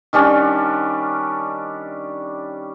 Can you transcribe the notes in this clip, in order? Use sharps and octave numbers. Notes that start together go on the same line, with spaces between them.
D#3 G3 C#4 D4